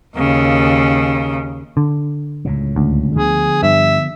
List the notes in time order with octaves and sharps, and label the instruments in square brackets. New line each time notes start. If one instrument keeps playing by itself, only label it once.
[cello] D#2 C#3
[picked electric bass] D3
[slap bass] C#2 A2 C#3
[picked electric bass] D2
[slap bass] D3 F3 B3 [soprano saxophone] G#4
[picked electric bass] G2 [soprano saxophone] E5